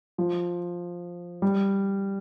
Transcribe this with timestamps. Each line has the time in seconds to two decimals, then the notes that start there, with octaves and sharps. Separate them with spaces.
0.18 F3
1.42 G3